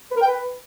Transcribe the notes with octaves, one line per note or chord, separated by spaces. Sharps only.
B4
A#4
G5
B4